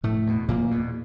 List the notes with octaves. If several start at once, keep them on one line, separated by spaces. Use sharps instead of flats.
F1 A2 A3
E2 B2
F1 A#2 A#3
E2 B2